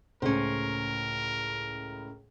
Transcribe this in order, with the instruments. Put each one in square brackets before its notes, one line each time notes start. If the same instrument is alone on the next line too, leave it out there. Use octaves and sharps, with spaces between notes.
[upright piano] C#2 A2 [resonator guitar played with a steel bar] C#4 C5 [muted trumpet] A#4